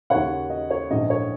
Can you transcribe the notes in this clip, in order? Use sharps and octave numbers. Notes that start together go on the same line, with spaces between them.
D#2 C#3 C#5 F#5
D#5
C#5
A#1 G#2 D#3 D#5
C#5